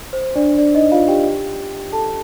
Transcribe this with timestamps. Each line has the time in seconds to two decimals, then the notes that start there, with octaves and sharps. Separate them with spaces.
0.13 C5
0.35 D4 D5
0.58 D4 D5
0.75 D#4 D#5
0.91 F4 F5
1.08 G4 G5
1.92 A4 A5